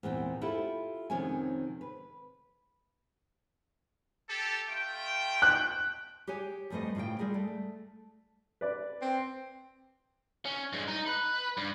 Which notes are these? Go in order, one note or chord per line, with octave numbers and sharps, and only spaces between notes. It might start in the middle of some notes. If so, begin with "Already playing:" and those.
E2 A#2 C4 G5
E4 F4 G4 A4
F2 C3 D#3 C#4 G#5
B4
G4 A4
A3 F4 G5
F#6
G4 G#4 C#5 G#5
F2 G3 A3 B4 C5 D#5
A2 C#3 A3 F4 G5
G3 G#3 G#4 A#4
A3
B4 D5
C4
C#4
G2 G#3
D#4
B4
G2